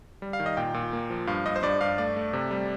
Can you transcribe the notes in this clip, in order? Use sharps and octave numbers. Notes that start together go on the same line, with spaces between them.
G3
F5
D#3
D#5
A#2 G5
A#2
A#3
F3
G2 F5
G2 D#5
C5
G2 D5
G2 F5
A3 D5
A3
C3
G3